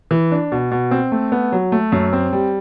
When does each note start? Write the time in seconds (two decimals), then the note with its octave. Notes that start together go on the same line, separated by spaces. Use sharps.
0.11 E3
0.32 D4
0.52 B2
0.71 B2
0.91 C4
1.12 A3
1.32 B3
1.52 F#3
1.72 A3
1.92 F#2
2.13 C4
2.33 G3